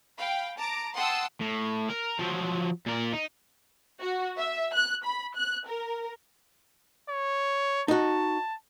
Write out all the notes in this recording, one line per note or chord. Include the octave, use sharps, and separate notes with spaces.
F5 G5 B5
A5 A#5 D6 D7
F#5 G5 A5 C6 D#6 E6
A2
A#4
F3 F#3
A#2 A#4
D#4
F#4
E5
F#6
B5
F#6
A#4
C#5
D#4 F#4 A5